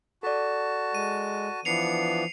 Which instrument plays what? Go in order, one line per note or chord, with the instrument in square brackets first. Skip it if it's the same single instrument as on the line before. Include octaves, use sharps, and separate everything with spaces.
[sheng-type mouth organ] F#4 A5 [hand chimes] A4 D5
[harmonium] G#3 [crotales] D#7
[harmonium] E3 F3 [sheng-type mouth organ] B3 D4 [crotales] C7 C#7 F7